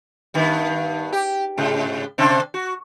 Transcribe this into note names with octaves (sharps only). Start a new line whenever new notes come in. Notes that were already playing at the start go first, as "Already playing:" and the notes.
G2 D#3 B3
G4
G#2 C#3
C3 C4 D4
F#4